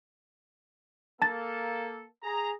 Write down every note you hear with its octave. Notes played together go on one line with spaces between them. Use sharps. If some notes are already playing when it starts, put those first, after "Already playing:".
A#3 A4 A5 A6
G#4 A#5